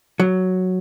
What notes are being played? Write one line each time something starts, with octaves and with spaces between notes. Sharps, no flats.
F#3